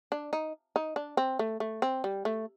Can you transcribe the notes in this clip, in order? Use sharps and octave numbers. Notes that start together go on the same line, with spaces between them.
D4
D#4
D#4
D4
C4
A3
A3
C4
G3
A3